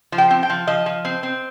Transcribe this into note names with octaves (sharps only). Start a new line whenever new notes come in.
F3
G5
C4
G5
F3
F3 D#5
F3
C4
C4